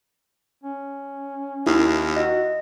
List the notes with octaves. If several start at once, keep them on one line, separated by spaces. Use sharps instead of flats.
C#4
D#2 E4
F#4 D#5